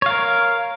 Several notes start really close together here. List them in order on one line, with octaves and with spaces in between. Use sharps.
C#5 F5 A#4